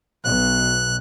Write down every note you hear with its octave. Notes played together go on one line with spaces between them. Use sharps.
B1 B2 F#6